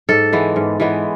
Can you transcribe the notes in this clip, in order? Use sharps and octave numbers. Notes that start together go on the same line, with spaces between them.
G#2 A4
E3 G#3 B3
G#2
E3 G#3 B3